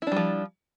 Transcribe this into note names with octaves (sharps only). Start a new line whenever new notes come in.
F3 G3 D4 E4